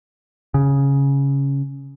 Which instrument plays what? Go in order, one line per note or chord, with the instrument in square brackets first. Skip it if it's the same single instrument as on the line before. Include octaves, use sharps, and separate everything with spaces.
[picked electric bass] C#3